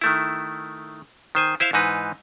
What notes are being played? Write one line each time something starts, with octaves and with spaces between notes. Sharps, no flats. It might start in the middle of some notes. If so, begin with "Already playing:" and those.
D#3 A3 E4
D#3 C5 G#5
E4 C5 E5 F5
G#2 E3 D#4 B4